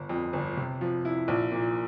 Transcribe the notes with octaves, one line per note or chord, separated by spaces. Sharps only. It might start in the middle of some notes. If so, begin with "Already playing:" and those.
Already playing: G1
F2
G1
C3
F3
E4
A#1
A#2